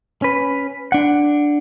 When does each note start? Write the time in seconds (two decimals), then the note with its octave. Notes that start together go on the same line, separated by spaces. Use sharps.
0.22 C#4 B4
0.92 D4 F#5